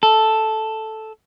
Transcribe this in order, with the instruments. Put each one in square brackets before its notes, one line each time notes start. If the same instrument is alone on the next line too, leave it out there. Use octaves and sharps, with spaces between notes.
[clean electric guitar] A4